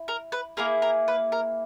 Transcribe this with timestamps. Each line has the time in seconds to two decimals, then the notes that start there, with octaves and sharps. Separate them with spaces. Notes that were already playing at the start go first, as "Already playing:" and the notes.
Already playing: E4
0.08 A#4
0.32 B4
0.57 A#3 E4 G#4 A#4
0.82 A#4
1.08 B4
1.32 A#4